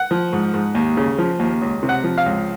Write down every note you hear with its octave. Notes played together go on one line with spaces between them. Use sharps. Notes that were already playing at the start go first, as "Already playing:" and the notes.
Already playing: F#5
F3
G#2
G#2
D#2
C#3
F3
D#2
C#2
C3
F#5
F3
F5
C#2